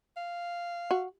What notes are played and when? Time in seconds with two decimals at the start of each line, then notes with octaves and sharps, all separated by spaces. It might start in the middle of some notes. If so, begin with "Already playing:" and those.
0.17 F5
0.91 F#4